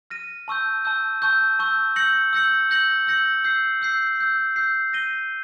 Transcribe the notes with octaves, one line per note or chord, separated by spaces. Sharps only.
F6 A#6 D#7
A5 C#6 E6 G6
A5 C#6 E6 G6
A5 C#6 E6 G6
A5 C#6 E6 G6
E6 G6 A#6 C#7 F#7
E6 G6 A#6 C#7 F#7
E6 G6 A#6 C#7 F#7
E6 G6 A#6 C#7 F#7
E6 G6 C7
E6 G6 C7
E6 G6 C7
E6 G6 C7
G6 A#6 D#7 G7